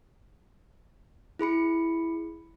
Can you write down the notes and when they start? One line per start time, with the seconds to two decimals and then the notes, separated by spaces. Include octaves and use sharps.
1.39 E4 G#4 B5 C#7